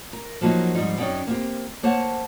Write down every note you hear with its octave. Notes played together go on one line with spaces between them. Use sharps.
A#4
F3 F#3 A#3 D#4 F#4
G#2 F3 G3 D#4
F#2 C#4 D#4 D5 G5
A#3 C4 G4
A#3 C5 C#5 F#5 A5